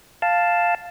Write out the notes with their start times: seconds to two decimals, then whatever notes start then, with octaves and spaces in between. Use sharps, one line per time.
0.22 F5 A5